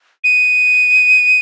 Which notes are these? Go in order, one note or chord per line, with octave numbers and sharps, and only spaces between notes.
D#7